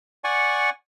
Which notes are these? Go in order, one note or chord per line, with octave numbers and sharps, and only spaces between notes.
D5 F#5 G#5 C#6